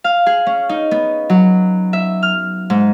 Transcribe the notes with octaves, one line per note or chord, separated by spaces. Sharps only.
F5
G#4
C#4
D#4
B3
F#3
E5
F6
G#2